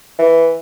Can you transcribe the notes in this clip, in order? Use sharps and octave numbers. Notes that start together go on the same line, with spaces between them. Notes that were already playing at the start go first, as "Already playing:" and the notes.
E3